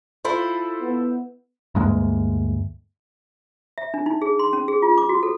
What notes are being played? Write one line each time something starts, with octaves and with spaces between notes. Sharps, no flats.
E4 F4 A4 C5 B5
B3
D2 G2 G#3 A#3
E5
D4
D#4
G#4
C6
C#4
G#4
F4
D6
F#4
A4